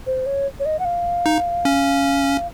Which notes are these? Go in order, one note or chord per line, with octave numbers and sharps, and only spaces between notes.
C5
C#5
C#5
D#5
F#5
F5
D#4
C#4